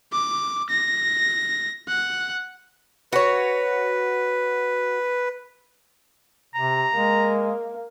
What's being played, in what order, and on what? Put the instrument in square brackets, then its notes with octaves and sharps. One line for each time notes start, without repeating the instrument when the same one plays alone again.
[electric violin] D6
A#6
F#5
[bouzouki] F#4 C#5 [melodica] B4
[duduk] C3 [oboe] A#5
[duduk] G#3 [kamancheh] A#3